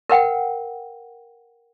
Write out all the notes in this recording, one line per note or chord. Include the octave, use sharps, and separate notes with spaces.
A#4 B4 F#5 G5